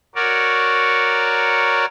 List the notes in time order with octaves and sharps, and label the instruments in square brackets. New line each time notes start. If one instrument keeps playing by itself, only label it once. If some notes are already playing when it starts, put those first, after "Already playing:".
[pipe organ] F#4 A#4 C#5 D5